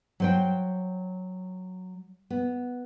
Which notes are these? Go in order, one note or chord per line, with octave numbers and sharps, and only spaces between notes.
F#3 C5 G5
B3